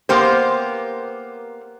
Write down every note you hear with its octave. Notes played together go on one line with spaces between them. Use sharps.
A#3 B3 G4 C5